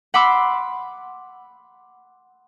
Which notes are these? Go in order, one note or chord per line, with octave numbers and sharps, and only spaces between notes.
F#5 B5 C6 D6 E6